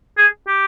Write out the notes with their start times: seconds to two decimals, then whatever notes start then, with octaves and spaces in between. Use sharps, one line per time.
0.18 G#4
0.48 G4